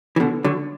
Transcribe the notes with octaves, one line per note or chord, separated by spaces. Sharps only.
E3
B2 D3
D3 F#3